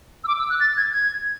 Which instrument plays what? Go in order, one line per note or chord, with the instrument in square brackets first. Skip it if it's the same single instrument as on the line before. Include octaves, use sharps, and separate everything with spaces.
[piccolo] E6
D6
E6
F#6
A6
G#6
G#6